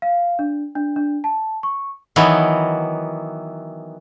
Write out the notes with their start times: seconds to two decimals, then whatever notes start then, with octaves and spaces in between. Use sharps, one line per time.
0.02 F5
0.39 D4
0.75 D4
0.96 D4
1.24 A5
1.63 C#6
2.16 D#3 E3 F#3 B3